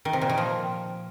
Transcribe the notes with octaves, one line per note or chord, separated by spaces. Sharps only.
D#3
C3
A#2
D#3
F3